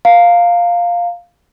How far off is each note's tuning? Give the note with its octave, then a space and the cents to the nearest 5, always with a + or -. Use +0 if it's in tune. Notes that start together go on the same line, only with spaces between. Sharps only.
F5 +0 A#5 -30